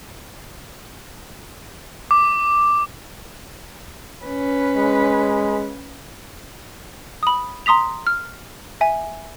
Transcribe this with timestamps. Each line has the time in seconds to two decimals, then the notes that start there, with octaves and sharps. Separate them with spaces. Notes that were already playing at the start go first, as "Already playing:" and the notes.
2.11 D6
4.24 C#4 B4
4.77 G#3
7.23 B5 D#6
7.66 A#5 C6 D#6 B6 F7
8.07 F6
8.81 E5 G#5